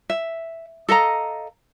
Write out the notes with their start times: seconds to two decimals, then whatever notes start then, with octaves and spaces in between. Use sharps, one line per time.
0.10 E5
0.89 A4 D#5 F5 A#5